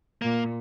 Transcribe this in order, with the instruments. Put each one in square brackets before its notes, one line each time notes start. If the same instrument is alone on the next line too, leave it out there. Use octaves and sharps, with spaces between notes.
[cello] A#2 [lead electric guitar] A#3